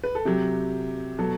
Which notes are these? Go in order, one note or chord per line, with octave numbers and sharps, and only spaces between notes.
B4
A4
C3 F#3 G4
B2 F#3 A4